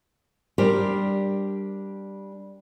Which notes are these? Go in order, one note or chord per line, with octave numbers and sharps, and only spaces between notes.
G3 D4 G4 A#4 C5